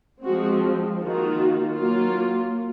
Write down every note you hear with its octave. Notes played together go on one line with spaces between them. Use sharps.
F3 G#3 C4 F#4
D#3 A#3 F4 F#4
F#3 A#3 F4